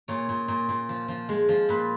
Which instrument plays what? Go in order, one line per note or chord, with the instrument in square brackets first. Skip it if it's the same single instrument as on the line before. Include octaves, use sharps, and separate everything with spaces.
[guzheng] A#2 C#5
A#2
A#2
A#2
F3
F3
G#3
F3
A#2 B4